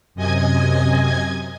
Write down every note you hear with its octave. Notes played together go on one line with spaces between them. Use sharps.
F#2 C3 D#5 G#5 G#6